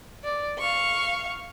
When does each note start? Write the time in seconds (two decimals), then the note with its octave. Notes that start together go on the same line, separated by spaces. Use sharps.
0.24 D5
0.58 F5 C#6